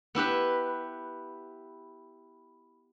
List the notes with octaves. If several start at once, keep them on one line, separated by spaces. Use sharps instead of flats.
B3 E4 G4 B4